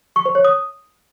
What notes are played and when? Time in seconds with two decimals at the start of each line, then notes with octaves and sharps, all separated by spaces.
0.16 C#6
0.26 C5
0.35 C#5
0.45 D#6